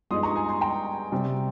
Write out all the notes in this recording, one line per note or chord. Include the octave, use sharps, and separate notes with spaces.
G2 F3 G#3 D#4 C6 D#6
A#5 C#6
G#5 C6
G#5 C6
G5 A#5
C3 G3 C4